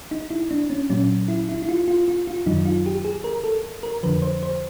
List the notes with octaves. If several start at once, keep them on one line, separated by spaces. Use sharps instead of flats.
D#4
E4
D4
C#4
A#2 F#3 C#4
E4
E4
E4
F4
F4
F4
F4
F#2 D#3 F#3 D#4
F4
G4
G#4
A#4
A4
A#4
F2 D3 F3 B4
C5
C5